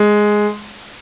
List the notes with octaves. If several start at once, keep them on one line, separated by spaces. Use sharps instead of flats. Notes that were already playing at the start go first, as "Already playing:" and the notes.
Already playing: G#3